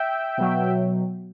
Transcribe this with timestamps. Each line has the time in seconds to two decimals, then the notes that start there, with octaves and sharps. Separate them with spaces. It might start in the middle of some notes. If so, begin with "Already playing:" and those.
Already playing: E5 G5
0.38 B2 F#3